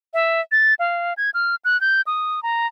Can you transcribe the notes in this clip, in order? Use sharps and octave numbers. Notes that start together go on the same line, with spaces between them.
E5
A6
F5
G#6
F6
F#6
G6
D#6
A#5